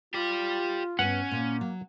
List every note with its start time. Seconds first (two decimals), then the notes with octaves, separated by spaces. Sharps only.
0.14 F4 G4 D5
0.99 G2 B3 C#4 F#5
1.31 A#2 A#3
1.61 F#3